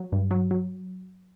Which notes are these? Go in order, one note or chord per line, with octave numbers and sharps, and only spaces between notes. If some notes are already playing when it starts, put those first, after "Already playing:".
Already playing: F#3
G2
F#3
F#3